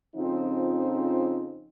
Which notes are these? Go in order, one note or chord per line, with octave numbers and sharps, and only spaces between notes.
F2 C#3 F3 C4 D#4